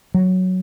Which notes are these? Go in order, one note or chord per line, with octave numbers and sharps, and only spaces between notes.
F#3